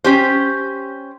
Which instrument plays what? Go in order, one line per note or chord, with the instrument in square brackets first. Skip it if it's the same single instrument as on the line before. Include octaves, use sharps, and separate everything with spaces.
[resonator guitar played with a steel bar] C#4 G4 C5